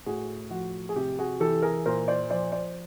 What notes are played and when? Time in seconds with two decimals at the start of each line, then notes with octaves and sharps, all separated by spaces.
0.06 A2 F#4 G#4
0.50 F3 F#4
0.89 G#4
0.96 C3 G4
1.19 F#4 G#4
1.40 E3 G4 A4
1.62 G#4 A#4
1.86 A#2 A#4 C5
2.08 C5 D5
2.30 F3 C5 D5
2.52 C5 D5